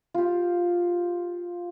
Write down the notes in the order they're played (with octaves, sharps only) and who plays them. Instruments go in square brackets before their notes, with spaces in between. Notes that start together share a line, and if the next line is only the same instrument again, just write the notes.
[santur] F4 G4